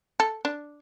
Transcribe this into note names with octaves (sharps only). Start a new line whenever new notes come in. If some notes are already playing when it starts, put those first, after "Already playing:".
A4
D4